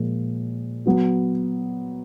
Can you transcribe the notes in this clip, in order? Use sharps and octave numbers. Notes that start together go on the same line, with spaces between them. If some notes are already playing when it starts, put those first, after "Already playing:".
Already playing: A#2 F3 G#3
F#3 B3 F#4